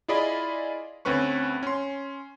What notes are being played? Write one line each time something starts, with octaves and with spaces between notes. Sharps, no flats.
E4 F4 G#4 D5 D#5 B5
D2 C4 C#4 B4 C#6
C#4 C6